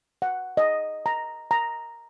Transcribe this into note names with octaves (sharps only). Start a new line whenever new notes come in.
F#5
D#5
A#5
A#5